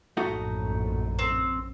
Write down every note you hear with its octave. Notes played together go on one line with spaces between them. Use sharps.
A#1 F#2 A2 A3 D#4 F#4
C4